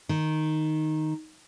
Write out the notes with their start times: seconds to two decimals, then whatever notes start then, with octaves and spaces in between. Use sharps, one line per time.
0.09 D#3